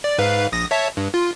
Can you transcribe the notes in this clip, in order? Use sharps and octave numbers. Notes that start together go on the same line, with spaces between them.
D5
G#2 B4 F5
A#1 D#6 A#6
C#5 E5 A5
G2
F4